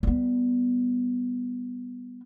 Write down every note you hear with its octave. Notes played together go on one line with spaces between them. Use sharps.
G3 B3